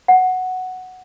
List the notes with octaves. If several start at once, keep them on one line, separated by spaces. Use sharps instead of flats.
F#5